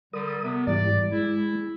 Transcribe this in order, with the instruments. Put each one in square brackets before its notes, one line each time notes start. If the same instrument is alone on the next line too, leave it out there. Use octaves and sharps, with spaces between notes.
[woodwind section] D3 G3 [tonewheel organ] A#4 D#6
[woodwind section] C3 B3
[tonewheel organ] G#2 E3 G3 [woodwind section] D5
[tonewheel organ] G#3 [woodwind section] E4